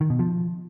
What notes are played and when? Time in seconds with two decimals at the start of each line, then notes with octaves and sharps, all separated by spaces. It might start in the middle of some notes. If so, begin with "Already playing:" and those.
0.01 D#3
0.10 B2
0.19 F3